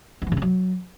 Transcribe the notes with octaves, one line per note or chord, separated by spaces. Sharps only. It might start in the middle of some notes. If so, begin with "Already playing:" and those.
B3
E3
C#3
C4
F#3